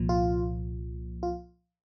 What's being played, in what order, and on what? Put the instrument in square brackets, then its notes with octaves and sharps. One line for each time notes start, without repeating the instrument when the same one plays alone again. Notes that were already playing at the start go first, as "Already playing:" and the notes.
Already playing: [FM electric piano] C2 A#2 F3
F4
F4